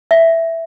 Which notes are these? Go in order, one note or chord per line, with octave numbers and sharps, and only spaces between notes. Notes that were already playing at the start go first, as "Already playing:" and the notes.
E5